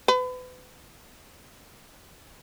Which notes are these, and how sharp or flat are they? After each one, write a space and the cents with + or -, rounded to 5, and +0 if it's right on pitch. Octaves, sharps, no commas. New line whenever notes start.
B4 +35